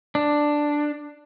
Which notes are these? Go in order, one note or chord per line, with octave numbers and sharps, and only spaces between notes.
D4